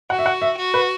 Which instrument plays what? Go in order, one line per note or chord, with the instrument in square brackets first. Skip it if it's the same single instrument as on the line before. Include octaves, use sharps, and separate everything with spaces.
[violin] F#4 [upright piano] F#5
[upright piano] E5
F#5
E5
[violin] F#4
[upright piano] B4